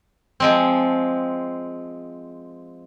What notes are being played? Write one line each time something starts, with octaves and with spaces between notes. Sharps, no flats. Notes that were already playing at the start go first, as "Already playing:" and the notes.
F3 G#3 C4